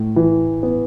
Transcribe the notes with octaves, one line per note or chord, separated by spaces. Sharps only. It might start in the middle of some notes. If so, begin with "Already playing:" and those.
Already playing: A2
E3
B3